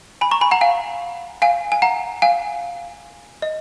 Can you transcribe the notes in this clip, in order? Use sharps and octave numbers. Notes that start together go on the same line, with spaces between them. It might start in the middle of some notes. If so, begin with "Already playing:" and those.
G#5 B5
A#5 C#6
G#5 B5
F#5 A#5
F5 G#5
F5 G#5
G#5
F#5 A#5
F5 G#5
D#5